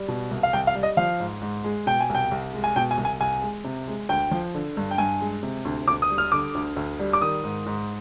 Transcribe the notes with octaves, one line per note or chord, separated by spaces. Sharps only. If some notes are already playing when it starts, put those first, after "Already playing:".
Already playing: G3
B2
C2
F5
C2 G5
F5
G3
D#5
F3 F5
G#2
G#2
G#3
B2 G5
G#5
C2
G5
C2
G#3
G#5
B2 G5
G#5
C2
G#5
C2 G#5
G#3
C3
G#3
D2 G5
F3
D3
G2
G5
G2 G#5
G#3
C3
D2
D2 D6
D#6
G3
F6
D3 D6
D2
D2
G3
D6
D#3 D#6
G#2
G#2